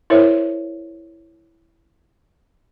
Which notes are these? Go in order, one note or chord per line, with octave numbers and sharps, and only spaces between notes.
E4 A#4 C5 C#5 E5